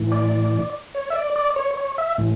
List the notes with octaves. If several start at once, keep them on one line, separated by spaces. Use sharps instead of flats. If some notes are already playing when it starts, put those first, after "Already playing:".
Already playing: A2 E3
D5
C#5
E5
D5
D5
C#5
C#5
E5
A2 E3